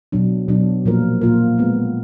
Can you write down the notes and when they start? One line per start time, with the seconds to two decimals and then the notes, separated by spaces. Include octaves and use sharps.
0.12 B2 F#3 D4
0.48 B2 F#3 D4
0.85 A#2 F3 A#3 F4 A#4
1.21 A#2 F3 A#3 F4 A#4
1.58 G#3 B3 F4